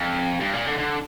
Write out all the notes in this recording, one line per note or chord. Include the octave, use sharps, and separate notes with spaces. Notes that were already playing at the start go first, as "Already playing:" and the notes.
Already playing: F2
G2
A#2
D3
D3